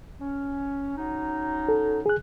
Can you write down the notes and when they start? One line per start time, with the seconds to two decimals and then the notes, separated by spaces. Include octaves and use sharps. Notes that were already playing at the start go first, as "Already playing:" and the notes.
0.19 C#4
0.97 F#3 C#4 D#4
1.68 A4
2.06 G#4 F#6